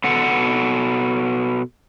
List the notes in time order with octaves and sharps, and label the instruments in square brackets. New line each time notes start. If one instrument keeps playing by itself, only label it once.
[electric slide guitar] B2 A4 F#5